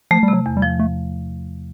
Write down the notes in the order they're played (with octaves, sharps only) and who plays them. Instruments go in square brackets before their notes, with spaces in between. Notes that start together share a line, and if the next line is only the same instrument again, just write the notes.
[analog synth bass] F3 [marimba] A3
[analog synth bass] G3
[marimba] C3
[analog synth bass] F#3
[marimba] E2
[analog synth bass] G3
[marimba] F3
[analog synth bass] A3